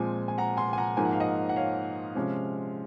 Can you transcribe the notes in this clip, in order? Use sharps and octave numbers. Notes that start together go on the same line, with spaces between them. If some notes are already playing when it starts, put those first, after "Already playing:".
Already playing: A#2 F3 G#3 C4 G#5
G#5
F#5 A#5
G#5 C6
G#5
F#5 A#5
G#2 F3 A#3 G#5
F#5
F5
D#5 F#5
F#5
C#5 F5
C3 F3 G#3 C#4